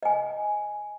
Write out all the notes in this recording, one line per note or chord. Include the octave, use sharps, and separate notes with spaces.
D#5 G#5